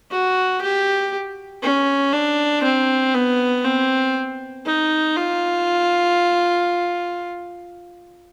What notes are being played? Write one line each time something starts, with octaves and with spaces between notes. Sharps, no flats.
F#4
G4
C#4
D4
C4
B3
C4
D#4
F4